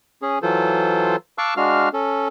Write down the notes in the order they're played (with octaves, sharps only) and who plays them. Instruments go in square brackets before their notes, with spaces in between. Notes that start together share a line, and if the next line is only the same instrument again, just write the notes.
[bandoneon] C#4 G#4
E3 F#3 F4 A4 C5
F5 A5 C#6 D6 E6 F#6
G#3 D4 F#4 F5 F6
C#4 A4